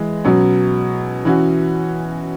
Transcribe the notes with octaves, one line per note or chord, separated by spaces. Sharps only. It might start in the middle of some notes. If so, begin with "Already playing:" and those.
Already playing: E3 G#3
B2 F#3 C#4
E3 C#4 F#4